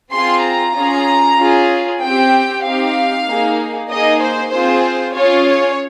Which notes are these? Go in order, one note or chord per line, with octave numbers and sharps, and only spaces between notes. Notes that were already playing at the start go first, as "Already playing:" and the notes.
C4 F4 G#4 C6
A#5
C#4 F4 G#4
C#4 F4 G#4
C4 G4 G5
C4 D#4 G4 F5
A#3 D#4 G#4
A#3 D#4 G#4 D#5
C5
C4 F4 G#4 C5
C#4 F4 G#4 C#5
C#5